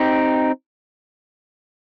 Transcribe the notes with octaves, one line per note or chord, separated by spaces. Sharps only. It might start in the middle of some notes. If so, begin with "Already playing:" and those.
Already playing: C4 D#4 G4